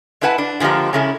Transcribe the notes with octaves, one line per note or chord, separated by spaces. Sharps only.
G#3 D4 E4 B4 F#5 A5
D4
D3 F3 G#3 A#3 G4
C#3 G#3 C#4 E4 A4